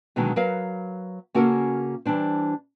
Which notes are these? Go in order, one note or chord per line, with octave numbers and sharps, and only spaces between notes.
B2 D3 D#3 F#3 G#3
F#3 A#4 B4 F5
C#3 A#3 C#4 F#4 A4 A#4
E3 G3 D4 C5